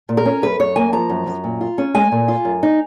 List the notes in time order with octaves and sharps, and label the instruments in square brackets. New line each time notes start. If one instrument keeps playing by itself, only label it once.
[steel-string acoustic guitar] A#2
A#4
C#4
F#2 B4
F#2 C#5
A#3 G#5
F3 A#5
F#2
F#2
A#2
F4
C#4
G#3 G#5
A#2
F4
F#2
D#4